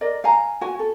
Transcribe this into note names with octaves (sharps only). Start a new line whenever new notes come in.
A#4 D5 D#5
F5 G#5 A#5
F#4 G#5
A4